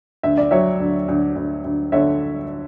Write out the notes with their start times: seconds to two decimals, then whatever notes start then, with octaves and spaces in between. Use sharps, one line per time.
0.23 D2 E5
0.37 D5
0.51 F#3 C#5 E5
0.80 D2
1.08 D2
1.36 D2
1.64 D2
1.92 D3 C#5 E5